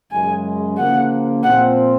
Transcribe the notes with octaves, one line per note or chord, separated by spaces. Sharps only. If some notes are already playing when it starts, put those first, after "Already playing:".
F#2 C#3 G#3 G#5
C#3 F3 A#3 F#5
A#2 F3 C4 F#5